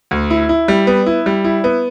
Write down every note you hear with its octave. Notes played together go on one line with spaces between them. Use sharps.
D2
E4
E4
G3
B3
E4
G3
E4
B3